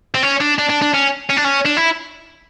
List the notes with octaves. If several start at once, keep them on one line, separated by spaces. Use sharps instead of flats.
C4
C#4
D4
D4
D4
D4
C#4
C#4
D4
C#4
D4
E4